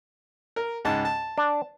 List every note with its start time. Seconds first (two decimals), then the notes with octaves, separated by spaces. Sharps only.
0.56 A#4
0.85 C#2 G#2 A5
1.05 A5
1.38 D4